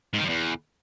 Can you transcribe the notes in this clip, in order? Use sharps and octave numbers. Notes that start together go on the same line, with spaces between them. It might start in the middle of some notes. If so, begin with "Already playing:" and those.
G#2
D#3
F#2
E2